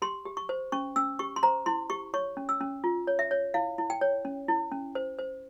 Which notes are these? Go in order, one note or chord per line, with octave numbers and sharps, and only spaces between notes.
G4 C6
G4
C#6
C5
C#4 C#6
C#4 E6
G4 C#6
C6
C5 A#5
E4 C6
G4 C#6
C#5 C#6
C#4
E6
C#4
F4
C#5
E5
C#5
E4 F5
E4
G5
C#5
C#4
E4
C#4
C5
C5